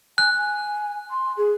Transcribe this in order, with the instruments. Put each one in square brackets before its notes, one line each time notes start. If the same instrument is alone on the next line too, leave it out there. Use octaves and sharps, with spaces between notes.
[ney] G#5 [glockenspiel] F#6
[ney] G#5
C6
G#4